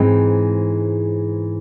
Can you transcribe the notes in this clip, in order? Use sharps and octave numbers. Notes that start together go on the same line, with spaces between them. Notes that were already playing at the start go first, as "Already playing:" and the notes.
Already playing: G#2 E3 G#3 C4